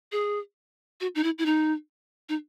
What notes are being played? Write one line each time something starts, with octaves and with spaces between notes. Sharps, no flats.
G#4
F#4
D#4
E4
E4
D#4
D#4